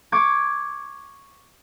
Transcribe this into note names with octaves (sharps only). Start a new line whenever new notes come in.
C#6 D6 G#6